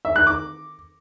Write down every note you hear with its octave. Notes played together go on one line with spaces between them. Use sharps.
E5
F#6
D6